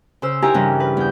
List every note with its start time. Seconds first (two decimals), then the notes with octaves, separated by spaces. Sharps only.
0.22 C#3 C5 E6
0.42 D#4 E4 G4 A#4 G#5 A#5
0.54 G2 C#3 E3 G3
0.80 B4
0.97 E2 G6